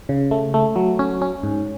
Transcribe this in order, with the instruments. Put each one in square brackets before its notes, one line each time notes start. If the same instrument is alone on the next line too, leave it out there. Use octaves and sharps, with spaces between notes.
[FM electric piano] C#3
A3
A3
F#3
C#4
C#4
G#2